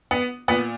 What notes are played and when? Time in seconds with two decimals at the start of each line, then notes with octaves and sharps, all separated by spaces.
0.11 B3
0.48 A#2 B3